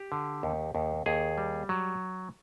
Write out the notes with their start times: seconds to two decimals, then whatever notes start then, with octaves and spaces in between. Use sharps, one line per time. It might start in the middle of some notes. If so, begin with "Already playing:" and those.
Already playing: G4
0.12 D3
0.43 D#2
0.75 D#2
1.06 D#2 G#4
1.38 G3
1.69 F#3